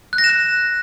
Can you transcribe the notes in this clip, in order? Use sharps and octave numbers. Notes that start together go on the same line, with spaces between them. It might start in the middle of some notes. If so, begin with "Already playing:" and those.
F#6
A#6
E7
F#6